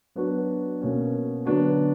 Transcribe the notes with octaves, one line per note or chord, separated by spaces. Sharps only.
F#3 B3 D4 F#4
B2 A#3 C#4 F#4
D3 F#3 B3 D4 F#4